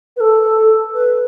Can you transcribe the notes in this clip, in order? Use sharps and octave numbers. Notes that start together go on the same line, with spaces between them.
B4
A4
B4